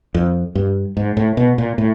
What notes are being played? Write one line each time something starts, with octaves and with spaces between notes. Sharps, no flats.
F2
G2
G#2
A2
B2
A#2
A2